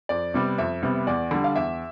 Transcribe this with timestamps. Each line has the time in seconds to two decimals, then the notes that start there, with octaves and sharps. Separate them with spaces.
0.09 F2 D5
0.34 C3 G3 B3
0.58 F2 E5
0.83 C3 G3 B3
1.07 E2 D5
1.31 D3 G3
1.44 F5
1.56 E2 E5